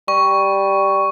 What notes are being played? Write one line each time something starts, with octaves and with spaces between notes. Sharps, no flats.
G3 C#6